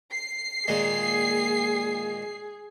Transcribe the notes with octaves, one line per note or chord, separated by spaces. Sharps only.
C7
A#2 D#3 G#3 G#4